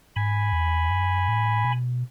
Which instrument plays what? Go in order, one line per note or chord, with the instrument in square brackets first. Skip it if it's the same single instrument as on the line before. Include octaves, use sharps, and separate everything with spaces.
[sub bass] G#2 [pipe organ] G#5 B5
[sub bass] E2
F#2
A2
B2